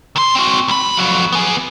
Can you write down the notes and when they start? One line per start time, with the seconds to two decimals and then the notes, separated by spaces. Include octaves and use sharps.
0.16 D#3 C6
0.35 C4 F#4
0.68 C#2 B5
0.97 F2 F#3
1.32 B3 G#4